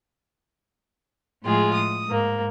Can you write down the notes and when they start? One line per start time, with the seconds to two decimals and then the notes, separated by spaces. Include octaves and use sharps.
1.43 A2 F3 G#3 F4 G#4
1.74 D#6
2.08 G#2 A#3